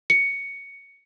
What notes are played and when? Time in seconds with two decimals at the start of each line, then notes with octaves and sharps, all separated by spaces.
0.10 C#7